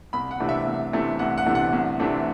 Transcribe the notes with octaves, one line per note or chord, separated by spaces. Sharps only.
C2 B5
F#5
C3 E3 A3 D4
E5
C2
C3 E3 A3 D4
C2 F#5
F#5
C3 E3 A3 D4
F#5
C2
C3 E3 A3 D4